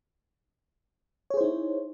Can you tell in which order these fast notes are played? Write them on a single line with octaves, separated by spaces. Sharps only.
C#5 G#4 C5 E4 D#4